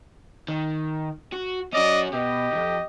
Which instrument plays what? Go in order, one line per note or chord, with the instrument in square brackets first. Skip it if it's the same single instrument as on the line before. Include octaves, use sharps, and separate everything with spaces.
[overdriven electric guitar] D#3
F#4
[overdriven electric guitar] C#4 F#4 [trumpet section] D5 D#5
[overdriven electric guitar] B2 [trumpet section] G4 D#5
[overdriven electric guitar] C2 F2